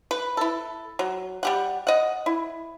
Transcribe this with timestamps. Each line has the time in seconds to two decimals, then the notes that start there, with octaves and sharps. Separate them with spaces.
0.11 B4
0.37 E4 A4
0.99 F#3
1.43 G3 G4 F#5
1.87 D#5 F#5
2.26 E4